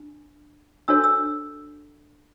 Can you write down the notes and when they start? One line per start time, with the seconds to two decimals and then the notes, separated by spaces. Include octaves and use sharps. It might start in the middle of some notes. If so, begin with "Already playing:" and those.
Already playing: D4
0.88 D4 F#4 A4 C#5 E6
1.04 E6